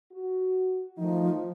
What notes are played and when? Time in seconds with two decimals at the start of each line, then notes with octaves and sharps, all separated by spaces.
0.12 F#4
0.98 D#3 F3 A3 D#4